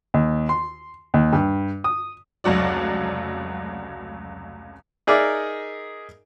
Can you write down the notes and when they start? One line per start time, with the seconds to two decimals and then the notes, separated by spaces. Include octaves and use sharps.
0.14 D#2
0.49 C6
1.14 D#2
1.33 G2
1.84 D#6
2.44 F1 C#2 F#3 F#4 D5
5.07 D#4 G#4 A#4 D5 E5